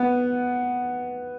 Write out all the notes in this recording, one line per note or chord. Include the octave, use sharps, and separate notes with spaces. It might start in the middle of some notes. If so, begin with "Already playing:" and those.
Already playing: B3